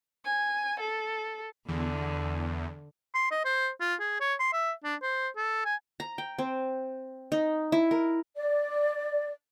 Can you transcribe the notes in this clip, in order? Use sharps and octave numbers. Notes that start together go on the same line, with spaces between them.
G#5
A4
E2 D3
C6
D#5
C5
F4
G#4
C#5
C6
E5
D4
C5
A4
G#5
A#5
G5
C4
D#4
E4
A#4
D5